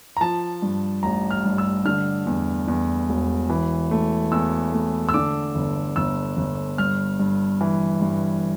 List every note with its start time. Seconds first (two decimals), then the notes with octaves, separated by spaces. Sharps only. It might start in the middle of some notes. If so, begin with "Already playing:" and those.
0.17 A#5
0.21 F3 A5
0.62 G2
1.03 A1 A#5
1.31 F6
1.45 G2
1.58 E6
1.85 D3 F6
2.27 E2
2.68 E2
3.09 E1
3.50 E3
3.91 A3
4.32 E2 E6
4.73 A3
5.09 E6
5.14 D3 D6
5.55 G1
5.96 G1 E6
6.37 G1
6.78 G2 F6
7.20 G2
7.61 E3
8.01 G2